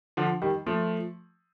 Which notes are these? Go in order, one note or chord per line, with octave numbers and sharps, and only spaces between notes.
D3 F3
D#3 G3
F3 A3